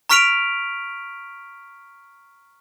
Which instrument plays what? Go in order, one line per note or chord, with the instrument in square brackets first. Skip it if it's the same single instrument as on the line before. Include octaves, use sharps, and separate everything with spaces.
[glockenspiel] A#5 C#6 F6 B6 D7 F7